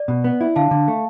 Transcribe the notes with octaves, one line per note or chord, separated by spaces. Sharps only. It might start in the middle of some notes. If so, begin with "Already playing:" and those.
Already playing: D5
B2
B3
E4
D3 F5 A5
D3
A3